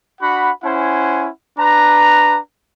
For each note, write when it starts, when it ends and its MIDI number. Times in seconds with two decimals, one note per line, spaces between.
0.21 0.51 62
0.21 0.51 66
0.21 0.51 78
0.21 0.51 83
0.63 1.28 61
0.63 1.28 64
0.63 1.28 72
0.63 1.28 78
0.63 1.28 80
1.58 2.38 62
1.58 2.38 71
1.58 2.38 82